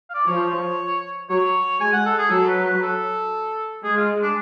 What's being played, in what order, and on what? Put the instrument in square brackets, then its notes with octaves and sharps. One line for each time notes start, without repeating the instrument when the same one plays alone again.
[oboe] F5
D5
[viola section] F3 [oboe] C#5
[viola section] F#3 [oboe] C#5
[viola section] G#3 [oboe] G#5
[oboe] F#5
A4
G#4
[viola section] F#3 [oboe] A4
[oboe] B4
B4
A4
[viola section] G#3 [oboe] G#4
[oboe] F4
D4